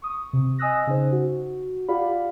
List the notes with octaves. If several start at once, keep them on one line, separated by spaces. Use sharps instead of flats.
C#6 D#6
C3
D#5 G#5 D#6 E6 F#6 A#6
C#3 D#4 C5
F#4
F4 G4 D5 F5 F#5 B5